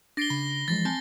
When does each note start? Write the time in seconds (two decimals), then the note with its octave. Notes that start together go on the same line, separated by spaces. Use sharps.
0.17 D4 A6 A#6 C7 D7 G7
0.30 C#3 B5
0.68 E3 F3 G#3 A6 A#6
0.85 C4 G#5 A5